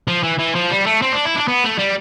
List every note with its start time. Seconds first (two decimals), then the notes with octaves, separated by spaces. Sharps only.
0.08 F3
0.23 E3
0.39 E3
0.55 F3
0.71 G3
0.86 A3
1.02 C4
1.12 D4
1.25 E4
1.36 D4
1.48 B3
1.64 A3
1.78 G3